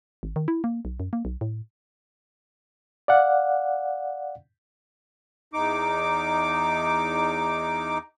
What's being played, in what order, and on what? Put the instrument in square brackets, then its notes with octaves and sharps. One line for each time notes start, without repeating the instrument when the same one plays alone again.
[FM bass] G#1
D#3
E4
A#3
B1
F#2
A#3
B1
A2
[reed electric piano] D5 F5 F#5
[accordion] E2 D#4 D6